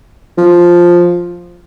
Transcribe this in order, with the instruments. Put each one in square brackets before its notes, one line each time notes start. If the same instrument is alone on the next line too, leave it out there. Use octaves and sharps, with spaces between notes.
[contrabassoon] F3